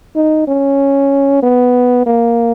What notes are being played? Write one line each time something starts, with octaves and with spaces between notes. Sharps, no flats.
D#4
C#4
B3
A#3